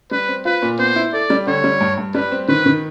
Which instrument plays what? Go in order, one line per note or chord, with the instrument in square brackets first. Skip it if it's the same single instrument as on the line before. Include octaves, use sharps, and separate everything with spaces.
[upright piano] G3 [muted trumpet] B4
[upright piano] C4
[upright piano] F4 [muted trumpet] B4
[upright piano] A#2
[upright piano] B3 [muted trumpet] C5
[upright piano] E4
[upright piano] A4 [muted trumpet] D5
[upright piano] G3
[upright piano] D3 [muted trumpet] C#5
[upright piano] G3
G2
G2
[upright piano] G3 [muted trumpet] B4
[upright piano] C4
[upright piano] D#3 [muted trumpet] B4
[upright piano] D#3